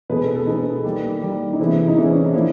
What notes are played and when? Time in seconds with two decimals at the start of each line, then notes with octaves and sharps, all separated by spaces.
0.10 B2 G#3 B3 B4
0.23 A4
0.35 A4
0.47 B2 G#3 B3 D#4
0.84 D#3 G3 A#3
1.21 D#3 G3 A#3
1.53 D#4
1.59 C3 E3 G#3 B3 E4
1.78 E4
1.88 D#4
1.96 C3 E3 G#3 B3 D4
2.06 C#4
2.16 C4
2.25 D4
2.34 F3 A#3 E4